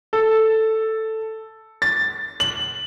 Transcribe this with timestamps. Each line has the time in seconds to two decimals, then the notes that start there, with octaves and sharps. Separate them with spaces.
0.13 A4
1.82 A6
2.40 F#7